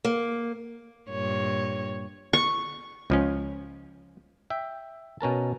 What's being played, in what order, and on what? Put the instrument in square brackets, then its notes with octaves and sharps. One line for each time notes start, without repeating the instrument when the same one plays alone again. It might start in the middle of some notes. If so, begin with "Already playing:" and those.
[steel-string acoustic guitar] A#3
[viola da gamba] G2 A#2 C#5
[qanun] C#6
[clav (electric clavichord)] C#2 F3 C#4
E5 G5
B2 C#4 A#4 A5